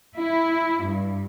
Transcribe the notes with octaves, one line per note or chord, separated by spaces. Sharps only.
E4
G2